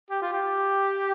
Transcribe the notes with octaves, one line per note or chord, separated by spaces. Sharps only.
G4
F4
G4